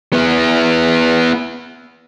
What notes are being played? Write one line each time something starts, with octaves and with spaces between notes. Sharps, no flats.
B3 E4